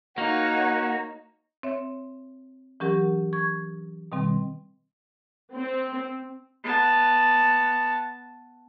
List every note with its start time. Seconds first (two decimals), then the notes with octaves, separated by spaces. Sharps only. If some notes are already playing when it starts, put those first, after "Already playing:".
0.18 A#3 D#4 F#4 C#5 F#5
1.63 C4 C#5 E5
2.80 E3 F#3 C#4 G4 A#4 F#5
3.33 C#6 G#6
4.12 B2 D#3 G3 C4
5.54 C4
6.64 B3 A5